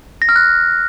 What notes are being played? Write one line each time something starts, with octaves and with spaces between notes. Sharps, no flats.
A#6
F6
F#6